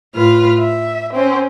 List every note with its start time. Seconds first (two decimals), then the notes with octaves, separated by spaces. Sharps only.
0.15 A2 F4 B4 F6
0.60 E5
1.14 C4 C#4